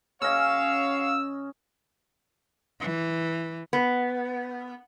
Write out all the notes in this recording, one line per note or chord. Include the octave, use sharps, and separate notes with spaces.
C#3 C#4 F#4 C#5 D#5 F5 E6
E3
B3